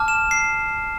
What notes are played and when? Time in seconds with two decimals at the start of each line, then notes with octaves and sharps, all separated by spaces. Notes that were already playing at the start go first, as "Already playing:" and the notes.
Already playing: A5 D6 F6
0.08 E7
0.31 C7